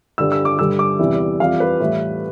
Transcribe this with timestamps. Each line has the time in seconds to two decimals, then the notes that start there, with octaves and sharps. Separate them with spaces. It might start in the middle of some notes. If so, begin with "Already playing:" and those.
0.18 G2 D3 G3 E6
0.32 E6
0.45 D6
0.59 G2 D3 G3 E6
0.79 D6
0.99 E2 C3 E3 G3
1.40 F2 E3 G3 F5
1.60 B4
1.80 A2 E3 G3